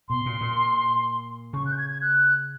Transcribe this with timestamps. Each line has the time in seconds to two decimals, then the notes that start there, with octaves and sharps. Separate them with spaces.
0.09 B2 C6
0.26 A#2
0.41 A#2
1.53 C#3 C#6
1.66 F#6
1.72 G6
1.78 G#6
1.90 G#6
2.02 F#6